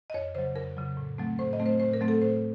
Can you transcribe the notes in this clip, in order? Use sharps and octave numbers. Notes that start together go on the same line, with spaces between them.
D#5
F2 C#5
C#3 F#3 C5
F2 A#4
C#3 F#3
A2
F#3 A3 C4
A2 C5
D#5
F#3 A3 C4
C5
A2 C5
A#4
F#3 A3 C4
A4
A2 C5